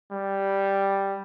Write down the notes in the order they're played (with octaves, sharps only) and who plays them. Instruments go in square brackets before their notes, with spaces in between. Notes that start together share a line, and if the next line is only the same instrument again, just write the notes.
[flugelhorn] G3